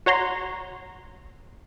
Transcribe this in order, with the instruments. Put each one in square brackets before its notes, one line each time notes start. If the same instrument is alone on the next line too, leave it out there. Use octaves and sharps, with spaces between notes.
[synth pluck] F#4 C#5 A#5 C6